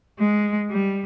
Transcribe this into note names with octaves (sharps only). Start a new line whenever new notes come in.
G#3
G3